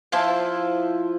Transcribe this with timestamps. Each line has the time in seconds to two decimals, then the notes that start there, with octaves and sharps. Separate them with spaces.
0.12 F3 E4 C5 A5